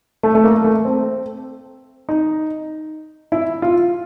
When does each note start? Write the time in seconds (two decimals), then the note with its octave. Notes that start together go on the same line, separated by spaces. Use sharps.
0.23 A3
0.35 A3
0.44 A#3
0.64 A3
0.85 C4
2.09 D#4
3.32 E4
3.62 F4